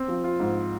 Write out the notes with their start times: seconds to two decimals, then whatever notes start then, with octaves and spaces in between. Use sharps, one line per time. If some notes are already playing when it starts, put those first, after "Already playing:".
Already playing: C4
0.08 F3
0.24 F4
0.40 G#2